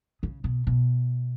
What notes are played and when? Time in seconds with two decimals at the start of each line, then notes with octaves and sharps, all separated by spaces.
0.23 C#3
0.44 B2
0.67 B2